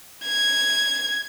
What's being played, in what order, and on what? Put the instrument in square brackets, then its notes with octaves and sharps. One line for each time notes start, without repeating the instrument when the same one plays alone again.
[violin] G#6